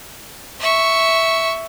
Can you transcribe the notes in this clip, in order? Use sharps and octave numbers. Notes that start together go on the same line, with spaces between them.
E5 C#6